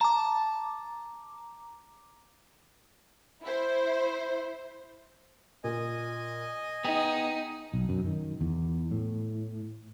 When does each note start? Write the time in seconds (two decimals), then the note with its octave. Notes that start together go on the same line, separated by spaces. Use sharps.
0.01 A5 A#5 D6
3.43 E4 C5
5.64 A#2 D#5 G#5
6.84 B3 D#4 G#4 G5
7.74 B1
7.89 F#2
8.06 D#3
8.41 E2
8.91 A2